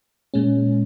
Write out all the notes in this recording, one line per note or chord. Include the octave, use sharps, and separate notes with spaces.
A#2 G#3 C#4